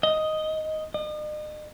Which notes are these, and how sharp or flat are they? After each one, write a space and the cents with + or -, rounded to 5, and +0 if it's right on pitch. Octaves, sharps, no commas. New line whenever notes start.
D#5 +5
D#5 -40